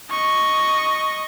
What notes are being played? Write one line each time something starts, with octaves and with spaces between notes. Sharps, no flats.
D#5 C#6